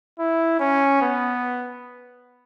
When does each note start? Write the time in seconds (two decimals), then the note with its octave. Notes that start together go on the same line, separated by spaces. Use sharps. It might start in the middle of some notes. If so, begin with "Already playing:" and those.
0.19 E4
0.60 C#4
1.02 B3